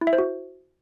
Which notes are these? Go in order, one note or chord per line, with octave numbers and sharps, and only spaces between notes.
E4
E5
C5
F#4